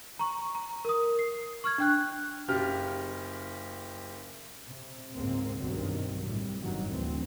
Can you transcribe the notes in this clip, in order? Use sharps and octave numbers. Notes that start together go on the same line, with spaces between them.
A#5 C#6
A#5
A#4 D#6
C7
C#6 F6 G#6
D4 G5 F#6
F#1 C#3 G4 F6
C3
C#2 G#2 C#3 A#3 C4
B1 G2 D#3 F#3 C4
A2 C3 G3
G1 G2 D#3 F#3
D2 E3 C4